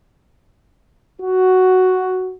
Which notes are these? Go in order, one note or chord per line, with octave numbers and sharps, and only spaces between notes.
F#4